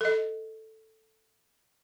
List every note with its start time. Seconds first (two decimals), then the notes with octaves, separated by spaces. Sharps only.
0.01 A4 D#5